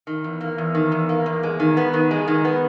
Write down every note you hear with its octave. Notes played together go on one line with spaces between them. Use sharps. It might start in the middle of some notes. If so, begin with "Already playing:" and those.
D#3
E2
A#3
E2
D#3
E2
A#3
E2
G#3
D#3
B3
D#3
G#3
D#3
B3